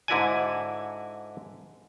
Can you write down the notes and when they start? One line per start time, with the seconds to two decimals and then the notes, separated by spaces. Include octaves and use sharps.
0.08 G#2 D3 E4 F#4 D5 G#5